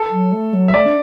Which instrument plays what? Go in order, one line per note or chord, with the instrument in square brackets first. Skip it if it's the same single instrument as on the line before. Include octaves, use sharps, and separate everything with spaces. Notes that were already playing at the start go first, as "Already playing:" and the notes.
Already playing: [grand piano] A4
[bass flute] F#3
A3
F#3
[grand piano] E5
[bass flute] A3 [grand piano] D5
[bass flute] D4